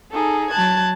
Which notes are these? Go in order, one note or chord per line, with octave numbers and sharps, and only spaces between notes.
D#4 G#4 A4
F#3 A5 F#6 G#6